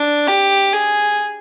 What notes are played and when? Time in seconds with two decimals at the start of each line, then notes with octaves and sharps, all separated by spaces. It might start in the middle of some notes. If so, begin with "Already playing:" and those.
Already playing: D4
0.27 G4
0.73 G#4